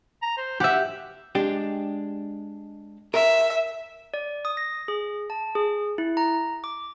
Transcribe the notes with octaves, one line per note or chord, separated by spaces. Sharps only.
A#5
C5
G4 E5 F#5
G#3 D4 G4
A#4 E5
D5
D#6
A#6
G#4
A5
G#4
E4
A#5
D6